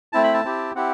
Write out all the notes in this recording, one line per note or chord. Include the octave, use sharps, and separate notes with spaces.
A3 C4 E4 A5
B5
A5
C4 E4 G4
C4 E4 G4 F#5